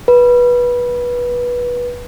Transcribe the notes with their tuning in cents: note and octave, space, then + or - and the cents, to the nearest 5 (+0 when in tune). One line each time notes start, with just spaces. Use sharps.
B4 -20